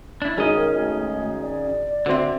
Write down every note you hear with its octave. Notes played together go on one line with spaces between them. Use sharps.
D4 E4
G#1 C#4 D#4 G#4 D#5
A#4
A3
D5
D3 C4 F#4 C5 E5